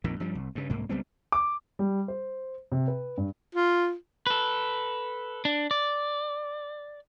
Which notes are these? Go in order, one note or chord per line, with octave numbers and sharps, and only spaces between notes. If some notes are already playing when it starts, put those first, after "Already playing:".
A#1 F2 A#2 D#3
G2 F3 G3
C2
G2 C#3
C2 G#2 A#3
C#2 G3 B3 C4
D6
G3
C5
C3
B4
G2
F4
A4 B4
D4
D5